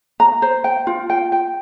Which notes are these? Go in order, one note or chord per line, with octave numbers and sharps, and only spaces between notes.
A#5
C5
G5
F4
G5
G5